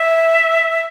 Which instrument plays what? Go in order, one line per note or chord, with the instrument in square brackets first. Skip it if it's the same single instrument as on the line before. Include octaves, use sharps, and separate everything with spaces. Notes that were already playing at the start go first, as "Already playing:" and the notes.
Already playing: [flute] E5